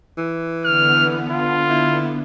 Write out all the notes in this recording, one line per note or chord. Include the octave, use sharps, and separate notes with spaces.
E3
D3 B3 F6
F4
E4